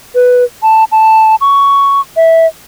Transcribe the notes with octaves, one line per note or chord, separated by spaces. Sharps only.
B4
A5
A5
C#6
E5